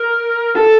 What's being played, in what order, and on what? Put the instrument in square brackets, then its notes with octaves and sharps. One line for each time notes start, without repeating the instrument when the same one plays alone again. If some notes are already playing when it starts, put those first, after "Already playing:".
Already playing: [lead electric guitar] A#4
A4